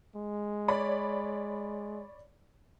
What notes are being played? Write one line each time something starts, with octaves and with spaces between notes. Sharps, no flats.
G#3
C#5 D5 B5